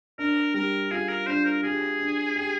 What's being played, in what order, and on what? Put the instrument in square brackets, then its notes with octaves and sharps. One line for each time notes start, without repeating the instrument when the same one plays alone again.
[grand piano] D4 [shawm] A#4
[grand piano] G3 [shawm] A#4
[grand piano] F4 [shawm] G#4
[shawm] A#4
[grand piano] D4 [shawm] C5
[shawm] A#4
[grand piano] G4 [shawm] G#4
[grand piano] D4
G4